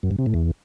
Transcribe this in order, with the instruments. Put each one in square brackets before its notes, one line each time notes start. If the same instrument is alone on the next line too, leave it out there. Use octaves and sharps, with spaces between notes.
[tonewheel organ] F#2
G2
C3
A2
E2